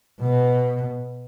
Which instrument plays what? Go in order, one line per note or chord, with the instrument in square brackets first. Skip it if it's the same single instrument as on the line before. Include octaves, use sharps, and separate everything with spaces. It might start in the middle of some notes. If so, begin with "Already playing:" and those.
[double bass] B2